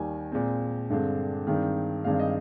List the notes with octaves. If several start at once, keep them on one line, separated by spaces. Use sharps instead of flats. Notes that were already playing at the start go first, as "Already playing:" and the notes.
Already playing: D#2 D#3 G3 G#5
A#2 G#3 C4
G2 D3 G#3 C4
G2 D#3 G#3 C4
G2 D#3 G#3 C4 F5
D#5